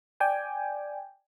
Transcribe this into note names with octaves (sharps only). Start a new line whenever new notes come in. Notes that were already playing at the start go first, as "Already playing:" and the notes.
D5 G5 G#5